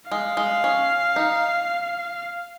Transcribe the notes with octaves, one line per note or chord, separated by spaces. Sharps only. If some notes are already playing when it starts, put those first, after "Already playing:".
G#3 F5
G#3
C#4
D#4